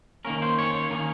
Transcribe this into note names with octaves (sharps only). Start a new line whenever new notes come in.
D#3 A#3 C#4 A#4
C5
C#5
C#5
D#3 A#3 C#4 D#4